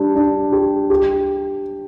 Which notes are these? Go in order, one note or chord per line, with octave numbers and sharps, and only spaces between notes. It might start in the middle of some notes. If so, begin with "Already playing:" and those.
Already playing: G3 D4
D4
G4
G4